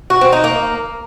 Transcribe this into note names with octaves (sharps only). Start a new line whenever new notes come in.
F#4
C4
D#4
A#3